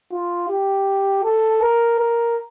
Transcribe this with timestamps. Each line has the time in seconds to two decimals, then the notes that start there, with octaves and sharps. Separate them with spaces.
0.12 F4
0.49 G4
1.24 A4
1.62 A#4
1.99 A#4